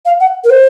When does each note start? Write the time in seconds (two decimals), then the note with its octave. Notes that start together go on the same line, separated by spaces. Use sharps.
0.05 F5
0.20 F#5
0.44 A#4
0.50 C5